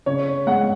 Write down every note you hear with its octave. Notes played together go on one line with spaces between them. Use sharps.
C#3 C#5
G#3 F#5